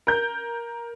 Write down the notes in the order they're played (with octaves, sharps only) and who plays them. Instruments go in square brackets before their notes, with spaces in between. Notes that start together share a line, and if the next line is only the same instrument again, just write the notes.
[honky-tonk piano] A#4 G6